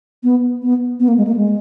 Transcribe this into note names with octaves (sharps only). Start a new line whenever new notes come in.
B3
B3
B3
A#3
G#3
A#3
G#3